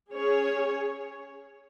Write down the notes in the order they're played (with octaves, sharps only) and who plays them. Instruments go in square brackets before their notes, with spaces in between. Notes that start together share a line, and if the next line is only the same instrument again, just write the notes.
[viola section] C#4 G#4 C#5